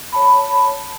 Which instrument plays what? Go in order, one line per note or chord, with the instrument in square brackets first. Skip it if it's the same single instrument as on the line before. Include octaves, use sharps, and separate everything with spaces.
[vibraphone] C#5 A5 B5